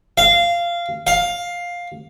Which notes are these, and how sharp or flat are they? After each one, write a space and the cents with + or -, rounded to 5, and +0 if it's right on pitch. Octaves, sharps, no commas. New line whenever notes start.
F5 -15
F5 +10